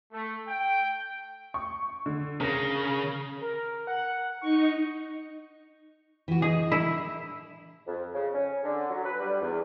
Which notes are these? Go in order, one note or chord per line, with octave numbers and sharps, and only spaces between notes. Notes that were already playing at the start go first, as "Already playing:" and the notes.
A3
G5
C#6
D3
C#3 A#4 A#6
A#4
F#5
D#4 C#6
E3 F#4
G#4 D#5
E4
F2
C#3
C#4
D3
F#3
B4
G3
E2